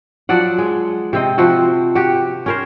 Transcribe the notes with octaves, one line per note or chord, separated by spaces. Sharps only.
F3 F#3 D5 F#5
G#3
C3 C4 D#5
F3 C4 F#4
F#4 G4
C#4 A#4 C5